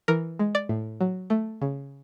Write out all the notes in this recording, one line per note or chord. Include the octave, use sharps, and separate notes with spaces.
E3 A#4
G#3
D5
A2
F#3
A3
C#3